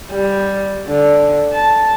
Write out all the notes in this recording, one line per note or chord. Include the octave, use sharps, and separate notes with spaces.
G3
D3
A5